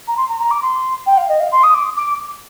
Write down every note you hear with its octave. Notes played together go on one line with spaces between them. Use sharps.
A#5
C6
A#5
A#5
D6
C6
G5
F5
D#5
F5
C6
D#6
D6
D6